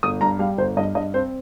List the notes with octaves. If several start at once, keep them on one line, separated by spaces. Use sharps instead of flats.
G1 D#6
G2 A#5
G3 F5
G1 C5
G2 D#5
G2 D#5
C4 C5